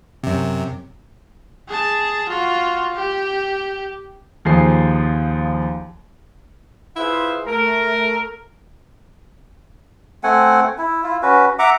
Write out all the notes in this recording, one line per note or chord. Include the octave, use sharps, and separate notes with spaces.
F#2 C3
G#4 A5
F4 F#4
G4
D#2 F3 G#4 C7
E4 F4 G#4 B4 C5 F5
A3 A#4
A3 C4 F#5 G#5
E4
E4 F4
C#4 F#4 B4
E5 F#5 A#5 D6